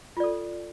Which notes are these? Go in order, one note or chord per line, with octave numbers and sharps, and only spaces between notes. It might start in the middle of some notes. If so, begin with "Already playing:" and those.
F4 A4 D5